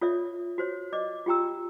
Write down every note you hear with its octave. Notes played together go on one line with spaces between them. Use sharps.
F4 A4 C#5 D5 E5
F#4 C5 C#5
D5 D#5 D6
F4 G4 G5 A#5 E6